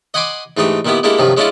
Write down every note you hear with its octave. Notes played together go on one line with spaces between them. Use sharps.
D#5 F#5 G#5 B5 C6 D6
G#2 E3 A3 D4 D#4 G4
A#2 D#3 B3 E4 G4
G#3 A#3 D4 E4 G4 A4
G2 C3 D#3 F3 F#3
G#3 C#4 D4 E4 F4 A4